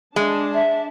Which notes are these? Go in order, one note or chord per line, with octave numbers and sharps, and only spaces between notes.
G#3 D4 A5
E5